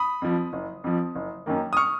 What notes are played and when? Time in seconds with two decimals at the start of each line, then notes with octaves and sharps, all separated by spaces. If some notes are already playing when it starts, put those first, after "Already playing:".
Already playing: B5 D#6
0.22 F2 F3
0.53 F#1
0.84 F2 F3
1.15 F#1
1.46 F#2 D#3 A#3
1.73 D#6
1.77 C#6 F6